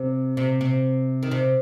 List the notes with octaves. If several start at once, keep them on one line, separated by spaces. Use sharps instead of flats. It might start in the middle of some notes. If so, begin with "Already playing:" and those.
Already playing: C3
C3
C3
D#3
C3